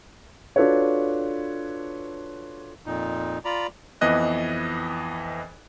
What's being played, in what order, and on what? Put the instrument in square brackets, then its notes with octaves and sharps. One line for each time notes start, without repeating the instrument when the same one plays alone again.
[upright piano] D4 F4 F#4 A4 B4 C#5
[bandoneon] F2 A#2 D#4
F4 D5 A#5 B5
[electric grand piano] F2 E3 B3 D#5 F#6